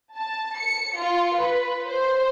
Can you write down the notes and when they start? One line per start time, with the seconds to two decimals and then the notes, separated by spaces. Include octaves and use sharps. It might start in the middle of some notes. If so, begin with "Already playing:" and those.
0.15 A5
0.57 C#7
0.99 F4
1.38 B4
1.88 C5